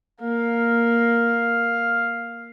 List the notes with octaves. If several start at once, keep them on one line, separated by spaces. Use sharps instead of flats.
A#3 F5